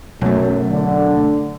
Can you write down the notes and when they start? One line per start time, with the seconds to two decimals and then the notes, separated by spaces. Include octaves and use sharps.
0.21 B1 F#2 A3
0.69 D3